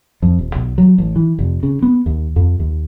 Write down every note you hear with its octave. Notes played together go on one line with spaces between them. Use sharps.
F2
D#1
B1
F#3
A1
E3
F1
C#3
B3
D#2
F2
D#2